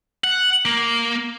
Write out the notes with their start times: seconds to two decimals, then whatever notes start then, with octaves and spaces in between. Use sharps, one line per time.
0.24 F#5
0.65 A#3